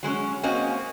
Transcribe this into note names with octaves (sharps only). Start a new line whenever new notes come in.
F#3 G#3 B3 C#4
A#3 C4 C#4 F#4 D#5 G#5